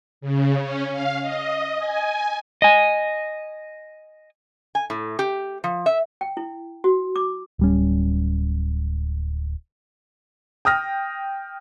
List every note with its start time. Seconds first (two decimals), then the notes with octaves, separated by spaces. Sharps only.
0.21 C#3
0.60 C#4
0.92 F5
1.21 D#5
1.78 G#5
2.62 D#5 G#5
4.75 G#5
4.90 A2
5.19 G4
5.64 F3
5.86 E5
6.21 G5
6.37 E4
6.84 F#4
7.16 D6
7.59 D1 G3 C#4
10.65 G5 D#6 F6 A#6